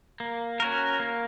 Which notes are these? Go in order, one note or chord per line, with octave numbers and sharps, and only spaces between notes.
A#3
C#4 F#4 A#4
A#3